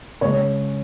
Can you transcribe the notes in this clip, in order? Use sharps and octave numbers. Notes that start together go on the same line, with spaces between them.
C#3 G#3 C#5